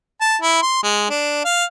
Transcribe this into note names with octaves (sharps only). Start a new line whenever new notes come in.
A5
E4
C6
G#3
D4
F5